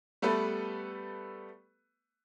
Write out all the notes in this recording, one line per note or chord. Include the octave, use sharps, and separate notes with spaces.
G3 A3 B3 A4 B4